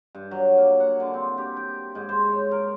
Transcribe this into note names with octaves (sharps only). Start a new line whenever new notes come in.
G2
F#3
A#3
F#5
D3
C4
G4
G5
G#2
C5
C#5
A#4